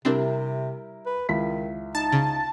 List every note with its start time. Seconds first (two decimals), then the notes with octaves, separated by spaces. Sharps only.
0.05 C3 G3 C4 D4 E4 A#4
1.06 B4
1.29 C#2 D#3 E4 B6
1.95 D#4 A5
2.12 C#3